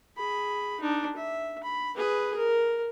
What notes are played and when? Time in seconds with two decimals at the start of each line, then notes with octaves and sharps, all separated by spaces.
0.17 G#4 B5
0.81 D4 D#4
1.16 E5
1.63 B5
1.97 G#4 B4
2.36 A#4